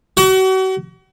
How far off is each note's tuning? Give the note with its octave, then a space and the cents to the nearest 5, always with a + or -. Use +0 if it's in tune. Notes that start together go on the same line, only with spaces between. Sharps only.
F#4 +40